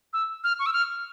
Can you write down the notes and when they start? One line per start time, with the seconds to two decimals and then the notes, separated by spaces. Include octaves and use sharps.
0.13 E6
0.44 F6
0.59 C#6
0.66 E6
0.73 F6